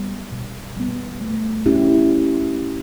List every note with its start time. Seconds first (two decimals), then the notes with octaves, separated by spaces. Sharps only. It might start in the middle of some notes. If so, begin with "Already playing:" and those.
Already playing: G3 B3
0.32 B2
0.77 G3 B3
1.21 A3
1.66 C#4 E4 G4